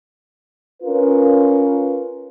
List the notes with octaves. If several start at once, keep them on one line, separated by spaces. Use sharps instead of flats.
C#4 F4 A#4 B4